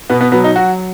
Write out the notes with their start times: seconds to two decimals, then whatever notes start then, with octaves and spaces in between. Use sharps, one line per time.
0.10 B2 B3
0.21 B3
0.32 F#3 B3
0.44 D#4
0.56 F#3 F#4